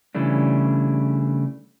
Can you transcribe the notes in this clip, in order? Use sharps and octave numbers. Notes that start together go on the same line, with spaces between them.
C#3 E3 G3 A3 D4